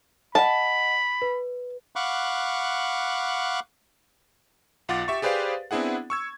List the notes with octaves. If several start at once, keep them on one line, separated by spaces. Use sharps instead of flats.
D#5 F#5 A5 B5
B4
F5 F#5 B5 C#6 D6 F#6
B1 F4 F#5 D6 A6
G4 E5 C#6
G4 G#4 B4 C5 D5 F5
B3 C4 D4 E4 G#4 F#5
C#6 E6 G#6